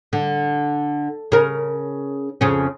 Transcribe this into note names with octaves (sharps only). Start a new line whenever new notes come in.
D3
C#3 A#4
F2 C#3 C#4